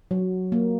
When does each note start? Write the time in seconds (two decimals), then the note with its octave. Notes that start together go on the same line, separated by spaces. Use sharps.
0.11 F#3
0.52 A#3